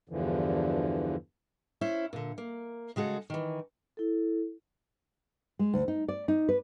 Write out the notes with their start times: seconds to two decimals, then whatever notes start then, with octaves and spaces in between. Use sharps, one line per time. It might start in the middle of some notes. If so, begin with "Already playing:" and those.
0.09 E2 G2 D3 E3 F3
1.81 C#4 E4 C5
2.13 A#2 D3
2.38 A#3
2.96 C#3 G#3 F#4 A4
3.30 D#3 E3
3.97 E4 A4
5.59 G#3
5.74 D2
5.88 D#4
6.08 D5
6.28 D#4
6.49 B4